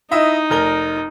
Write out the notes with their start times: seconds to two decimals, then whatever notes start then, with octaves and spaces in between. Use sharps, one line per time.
0.11 D#4 E4 D#5 E5
0.50 F1 A#4 G7